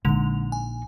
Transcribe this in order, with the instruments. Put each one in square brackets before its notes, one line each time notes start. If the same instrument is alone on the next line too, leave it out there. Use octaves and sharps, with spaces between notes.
[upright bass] A#1 D#4 [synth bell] D3 G#3 F7
[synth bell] G#5